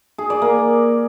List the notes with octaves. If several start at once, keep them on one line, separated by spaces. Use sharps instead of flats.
G#4
D5
A#3